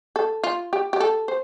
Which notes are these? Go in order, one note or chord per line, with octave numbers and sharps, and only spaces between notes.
A4
F4
G4
G4
A4
C5